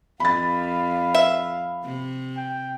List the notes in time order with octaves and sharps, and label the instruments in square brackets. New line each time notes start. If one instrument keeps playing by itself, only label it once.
[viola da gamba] F2 [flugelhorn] F5 [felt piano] B5 A6
[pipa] E5
[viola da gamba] C3
[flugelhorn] G5